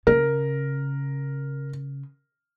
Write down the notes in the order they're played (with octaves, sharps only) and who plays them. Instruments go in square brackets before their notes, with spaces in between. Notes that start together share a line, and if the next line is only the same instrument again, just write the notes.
[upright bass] C#3 [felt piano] A#4